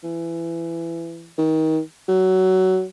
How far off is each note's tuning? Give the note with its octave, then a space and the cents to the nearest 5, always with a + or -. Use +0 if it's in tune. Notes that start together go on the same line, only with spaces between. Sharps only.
E3 +20
D#3 +30
F#3 +15